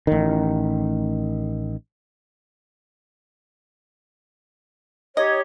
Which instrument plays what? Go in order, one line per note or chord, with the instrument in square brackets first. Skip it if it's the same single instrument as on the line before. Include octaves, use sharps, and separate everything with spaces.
[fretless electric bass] A1 D#3
[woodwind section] D#4 G4 C#5 [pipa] D#5